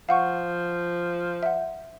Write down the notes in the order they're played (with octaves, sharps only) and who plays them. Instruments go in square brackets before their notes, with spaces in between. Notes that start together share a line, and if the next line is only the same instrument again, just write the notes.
[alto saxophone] F3 [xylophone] F5 F#5 C#6
[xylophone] E5 F#5